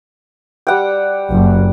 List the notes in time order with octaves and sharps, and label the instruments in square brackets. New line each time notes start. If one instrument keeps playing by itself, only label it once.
[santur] G3 F#5 G5
[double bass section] F#1